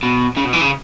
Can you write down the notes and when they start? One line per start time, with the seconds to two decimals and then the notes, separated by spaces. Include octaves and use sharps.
0.03 B2
0.37 C#3
0.45 B2
0.53 E3
0.62 C#3